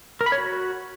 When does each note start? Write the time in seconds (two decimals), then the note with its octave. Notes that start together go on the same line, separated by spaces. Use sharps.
0.21 A#4
0.26 B5
0.32 C#5
0.38 F#4